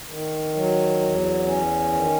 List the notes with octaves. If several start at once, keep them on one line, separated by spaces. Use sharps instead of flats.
D#3
F#3
E2
C#4
D#3